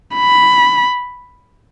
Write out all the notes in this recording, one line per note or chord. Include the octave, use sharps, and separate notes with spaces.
B5